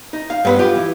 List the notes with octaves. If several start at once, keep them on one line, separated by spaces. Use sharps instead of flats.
D#4
F5
G2 B3 B4
F4 G4
E3